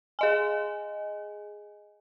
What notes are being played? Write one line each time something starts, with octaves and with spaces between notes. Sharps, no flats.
G#4 D#5 G#5